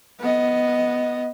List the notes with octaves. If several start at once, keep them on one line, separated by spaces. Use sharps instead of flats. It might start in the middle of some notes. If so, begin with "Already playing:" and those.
B3 D#5